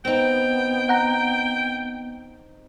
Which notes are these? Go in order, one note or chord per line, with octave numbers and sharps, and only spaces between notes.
B3 C4 D#4 G5
F#5 A#5